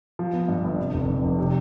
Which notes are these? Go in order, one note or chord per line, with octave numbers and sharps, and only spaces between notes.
F3
B3
G2
G1
C3
F1
F2
F1
C3